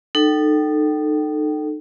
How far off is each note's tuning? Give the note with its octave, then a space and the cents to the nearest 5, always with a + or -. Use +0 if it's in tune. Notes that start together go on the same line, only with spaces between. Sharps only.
D#4 -30 A4 +0 G5 -25